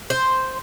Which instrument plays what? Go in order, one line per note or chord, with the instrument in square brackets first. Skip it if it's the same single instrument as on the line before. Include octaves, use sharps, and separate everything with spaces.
[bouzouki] C5